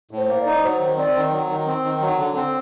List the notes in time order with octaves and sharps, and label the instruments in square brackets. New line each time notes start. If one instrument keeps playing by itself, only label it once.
[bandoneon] A2
[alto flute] C5
[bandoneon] A#3
[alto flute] D5
[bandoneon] D#4
[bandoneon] F#3 [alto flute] C5
[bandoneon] D#3
[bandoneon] C4 [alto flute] D5
[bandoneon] D#3
F#3
D#3
C4
D#3
F#3
D3
C4